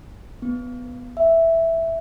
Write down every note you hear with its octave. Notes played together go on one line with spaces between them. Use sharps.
B3
E5